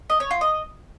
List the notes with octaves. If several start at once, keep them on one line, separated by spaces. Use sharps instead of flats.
D#5
C#5
F4
D#5